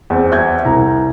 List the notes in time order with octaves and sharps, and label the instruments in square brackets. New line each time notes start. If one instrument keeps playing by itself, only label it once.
[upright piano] E2 C4
[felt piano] E5 G6 G#6
[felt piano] C2 [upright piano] A#5